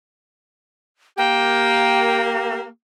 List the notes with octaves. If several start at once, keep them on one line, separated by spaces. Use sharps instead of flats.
A#3 G4 G5